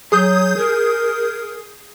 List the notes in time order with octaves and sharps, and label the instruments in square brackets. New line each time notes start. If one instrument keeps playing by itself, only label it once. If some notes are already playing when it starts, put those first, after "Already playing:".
[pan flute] F#3 [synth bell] G#4 D#6 G6
[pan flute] A#4